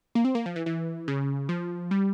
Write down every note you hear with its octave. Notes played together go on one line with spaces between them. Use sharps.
A#3
C4
A#3
F3
E3
E3
C#3
F3
G3